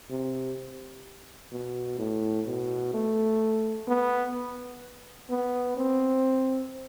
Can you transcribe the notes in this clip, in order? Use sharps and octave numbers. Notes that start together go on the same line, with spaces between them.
C3
B2
A2
B2
A3
B3
B3
C4